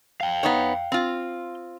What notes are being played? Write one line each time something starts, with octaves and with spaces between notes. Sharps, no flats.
F5 G5
B3 D#4 C#5
C4 F4